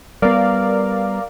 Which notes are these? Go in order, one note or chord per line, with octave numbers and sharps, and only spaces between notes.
G3 B3 A#4 D5 F5